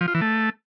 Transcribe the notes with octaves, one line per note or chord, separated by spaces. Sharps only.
F3
F4
E3
A3